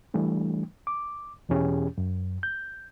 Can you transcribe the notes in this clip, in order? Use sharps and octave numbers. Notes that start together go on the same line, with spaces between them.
E3 G3 A3 D4
D6
E2 B2 E3 C#4 G4 G#4
F#2
G6